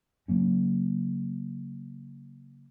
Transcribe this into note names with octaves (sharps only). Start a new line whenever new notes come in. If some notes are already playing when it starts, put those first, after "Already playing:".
C#3 F#3 A#3 C#4